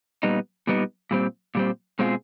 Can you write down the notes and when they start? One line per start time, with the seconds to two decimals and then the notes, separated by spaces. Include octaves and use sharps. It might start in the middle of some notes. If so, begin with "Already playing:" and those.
0.23 A#2 G3 B3 D#4
0.67 A#2 G3 B3 D#4
1.11 A#2 G3 C4
1.55 A#2 G3 C4
1.99 B2 G#3 C4 F4 G#4